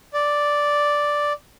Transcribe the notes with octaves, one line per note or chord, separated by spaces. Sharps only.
D5